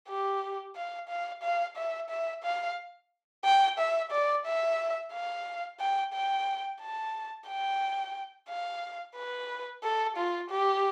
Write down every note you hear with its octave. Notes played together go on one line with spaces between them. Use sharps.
G4
F5
F5
F5
E5
E5
F5
G5
E5
D5
E5
F5
G5
G5
A5
G5
F5
B4
A4
F4
G4